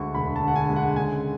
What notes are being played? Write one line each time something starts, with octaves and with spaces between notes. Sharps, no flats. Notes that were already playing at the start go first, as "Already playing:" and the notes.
Already playing: D2 D3 G#3 C#6
E1 B5
A5
D3
F#5
G#5
G#3
F#5
C#3 G#5